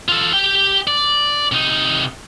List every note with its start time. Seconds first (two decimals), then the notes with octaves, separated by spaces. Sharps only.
0.09 F4 A4
0.33 G4 G5
0.87 D5
1.52 C3 D#4